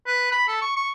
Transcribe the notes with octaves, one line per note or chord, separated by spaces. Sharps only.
B4
B5
A4
C#6
C#6